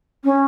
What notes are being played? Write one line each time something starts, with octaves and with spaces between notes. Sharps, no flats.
C#4